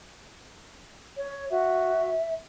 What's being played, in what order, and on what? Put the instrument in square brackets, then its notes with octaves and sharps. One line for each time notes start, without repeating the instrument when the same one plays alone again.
[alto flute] C#5
[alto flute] F#4 [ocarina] E5